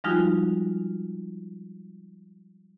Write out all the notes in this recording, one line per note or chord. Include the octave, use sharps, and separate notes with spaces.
F3 G3 G#3 D#4 F4 F#4